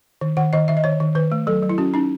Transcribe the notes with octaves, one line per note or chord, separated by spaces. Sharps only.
D#3
D#3 F#5
D#3 D#5
D#3 E5
D#5
D#3 C#5
D#3
D#3 B4
A3
F#3 A4
F#3
E4
C#4 F#4
C#4 D#4